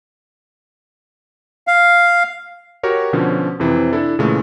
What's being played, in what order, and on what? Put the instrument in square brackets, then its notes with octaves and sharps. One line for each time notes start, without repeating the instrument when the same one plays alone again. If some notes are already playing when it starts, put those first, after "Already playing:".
[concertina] F5
[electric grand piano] F#4 G4 A#4 C#5
B2 D3 F3 C#4
F2 C3 E3
D4 E4 A4
A#2 C#3 E3 G#3 A3